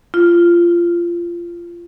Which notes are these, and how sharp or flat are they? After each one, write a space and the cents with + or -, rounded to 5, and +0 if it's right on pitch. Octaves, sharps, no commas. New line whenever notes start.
F4 -20